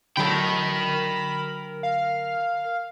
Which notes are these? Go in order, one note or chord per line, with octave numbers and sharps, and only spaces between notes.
D3 F#3 A4 A#4 G5 B5
F5